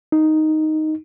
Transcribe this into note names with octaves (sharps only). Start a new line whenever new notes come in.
D#4